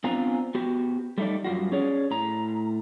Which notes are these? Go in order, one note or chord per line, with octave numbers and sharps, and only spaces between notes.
B3 C4 D4 F4 G#5 A#5
B3 F#4 G4
G3 A3 D#4 D5
F#2 G3 F4 F#4
C#4 G#4 C#5 D5
A2 A#5